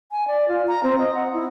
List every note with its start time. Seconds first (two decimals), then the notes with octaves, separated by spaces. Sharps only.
0.11 G#5
0.28 D5
0.48 F4
0.68 A#5
0.84 C4
0.99 D#5
1.15 F#5
1.33 E4